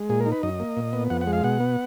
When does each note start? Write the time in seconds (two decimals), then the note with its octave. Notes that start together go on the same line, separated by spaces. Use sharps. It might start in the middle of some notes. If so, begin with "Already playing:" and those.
Already playing: G#3
0.09 A#2 G#4
0.21 A#4
0.26 D#4
0.32 B4
0.43 F#2 D#5
0.60 A#3
0.77 A#2
0.93 B3
1.10 F2 F#5
1.21 F#5
1.27 G#3
1.33 F5
1.44 B2 F#5
1.60 B3